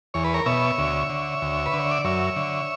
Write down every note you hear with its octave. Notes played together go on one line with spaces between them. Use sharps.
E2 C#5
B4
A#4 C#5
B2 C#5 E5
D2
D3
D2
B4
D3
C#5
D5
F#2 C#5 E5
D3